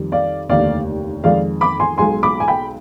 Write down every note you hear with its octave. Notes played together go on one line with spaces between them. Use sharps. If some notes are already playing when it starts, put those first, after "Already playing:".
Already playing: F2 D#3 G3
D5 F5
F1 D#2 D3 D5 F5
F2 D#3 G#3 D5 F5
B5 D6
G#5 C6
B1 B2 G#3 G#5 C6
B5 D6
G#5
G5 B5